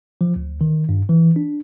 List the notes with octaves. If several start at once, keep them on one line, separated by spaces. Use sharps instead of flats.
F3
D2
D#3
G2
E3
D4